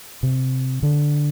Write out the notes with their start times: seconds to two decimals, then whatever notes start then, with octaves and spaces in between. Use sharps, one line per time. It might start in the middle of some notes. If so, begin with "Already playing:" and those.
0.23 C3
0.83 D3